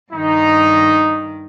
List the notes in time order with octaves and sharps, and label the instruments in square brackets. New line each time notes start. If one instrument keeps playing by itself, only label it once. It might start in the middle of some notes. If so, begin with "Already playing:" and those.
[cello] G2 D#3 [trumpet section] D#4